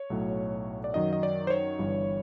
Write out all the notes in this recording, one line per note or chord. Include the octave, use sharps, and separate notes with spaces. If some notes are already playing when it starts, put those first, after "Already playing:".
Already playing: C#5
B1 A2 F#3 A3
D5
F#2 D#3 F#3 D#5
D#5
D5
C5
C#5
G1 G2 E3 G3